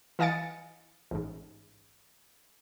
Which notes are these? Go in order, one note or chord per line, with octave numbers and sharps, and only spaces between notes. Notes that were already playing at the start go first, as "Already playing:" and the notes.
E3 D#5 F5 G#5 A6 C#7
A1 G#2